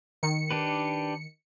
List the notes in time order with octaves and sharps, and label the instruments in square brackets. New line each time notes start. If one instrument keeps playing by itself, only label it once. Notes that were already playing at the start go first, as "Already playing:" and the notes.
[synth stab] D#3 C#7
[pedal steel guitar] D4 G4 B4